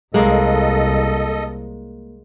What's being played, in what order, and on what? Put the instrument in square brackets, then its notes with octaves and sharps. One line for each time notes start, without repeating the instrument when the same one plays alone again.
[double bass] C2 [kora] G#3 A#3 [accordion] A4 D#5